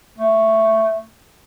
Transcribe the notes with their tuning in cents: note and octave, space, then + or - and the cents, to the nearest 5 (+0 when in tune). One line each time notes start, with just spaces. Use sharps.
A3 +5